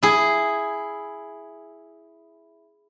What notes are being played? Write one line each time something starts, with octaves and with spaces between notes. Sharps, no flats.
E4 G#4